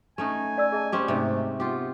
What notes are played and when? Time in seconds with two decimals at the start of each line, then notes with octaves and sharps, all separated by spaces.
0.18 A3 C#4 D#4 G#5
0.58 D5 E6
0.72 G#4 D#5 A5
0.92 C4 C#4 G4
1.08 G#2 C3 A3
1.60 B3 F4 G4